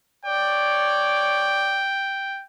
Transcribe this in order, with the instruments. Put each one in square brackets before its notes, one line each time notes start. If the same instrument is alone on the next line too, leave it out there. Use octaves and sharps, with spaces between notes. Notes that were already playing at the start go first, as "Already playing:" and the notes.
[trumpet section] C#5 D5 [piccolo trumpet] G5